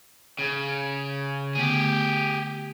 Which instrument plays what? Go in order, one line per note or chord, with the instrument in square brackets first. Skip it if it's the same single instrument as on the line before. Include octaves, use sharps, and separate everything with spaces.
[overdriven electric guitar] C#3
[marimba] D3 A3 B3 [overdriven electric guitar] G4 G#4